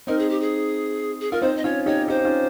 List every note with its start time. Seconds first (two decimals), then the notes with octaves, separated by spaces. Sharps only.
0.07 C4 D#4 A#4
0.18 G#4
0.29 G4
0.40 G#4
1.20 G#4
1.31 F4 A#4
1.41 C4 D#4 C5
1.56 D#5
1.64 C#4 F4 C#5
1.86 D#4 G4 C#5
2.08 D#4 G4 C5
2.19 D#4
2.25 C#4 F4